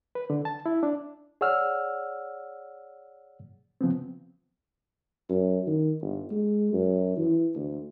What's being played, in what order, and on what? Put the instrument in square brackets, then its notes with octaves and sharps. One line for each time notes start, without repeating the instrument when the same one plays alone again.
[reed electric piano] B4
D3
A5
E4
D4
G#4 C#5 D5 F#5 E6 F6
C#3 F3 B3 C4
[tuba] F#2
D#3
G1
G#3
F#2
E3
D2